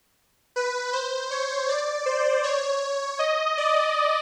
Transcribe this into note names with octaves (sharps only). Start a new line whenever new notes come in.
B4
C5
C#5
D5
C5
C#5
D#5
D5